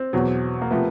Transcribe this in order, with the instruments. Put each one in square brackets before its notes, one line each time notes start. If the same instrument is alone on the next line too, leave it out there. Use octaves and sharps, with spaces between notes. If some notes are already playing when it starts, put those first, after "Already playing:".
Already playing: [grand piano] C4
[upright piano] E2 B2 F#3
[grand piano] A#3
[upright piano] C3 F3 A3 [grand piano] B3